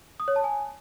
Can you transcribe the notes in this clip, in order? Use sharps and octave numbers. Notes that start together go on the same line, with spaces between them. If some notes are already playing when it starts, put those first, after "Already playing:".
D#6
C#5
A5
G#5